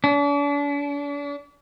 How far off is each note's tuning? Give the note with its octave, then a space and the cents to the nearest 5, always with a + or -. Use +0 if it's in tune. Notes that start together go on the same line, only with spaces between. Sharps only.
D4 -40